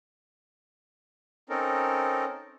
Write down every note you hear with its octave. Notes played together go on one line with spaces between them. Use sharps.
C4 C#4 D#4 A4 A#4